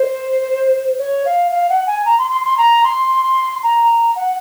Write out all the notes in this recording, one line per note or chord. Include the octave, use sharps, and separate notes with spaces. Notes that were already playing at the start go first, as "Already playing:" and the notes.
Already playing: C5
C#5
F5
F5
F#5
G#5
A#5
C6
C6
C6
A#5
C6
A#5
F#5